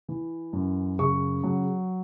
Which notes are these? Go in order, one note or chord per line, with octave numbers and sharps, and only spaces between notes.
E3
F#2
C#3 C#6
F#3